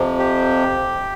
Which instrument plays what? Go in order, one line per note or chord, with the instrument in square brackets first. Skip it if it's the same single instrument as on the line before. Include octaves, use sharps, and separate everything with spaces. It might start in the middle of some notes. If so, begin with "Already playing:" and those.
Already playing: [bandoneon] F2 C3 F3
G4